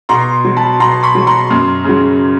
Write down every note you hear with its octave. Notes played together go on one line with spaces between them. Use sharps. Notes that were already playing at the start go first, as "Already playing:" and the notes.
B2 A#5 C6
F#3
A5 B5
B2 A#5 C6
B5 C#6
F#3
A#5 C6
F#2
C#3 F#3